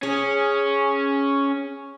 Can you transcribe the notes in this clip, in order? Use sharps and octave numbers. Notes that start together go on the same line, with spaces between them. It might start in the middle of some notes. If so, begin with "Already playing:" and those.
C#4 G#4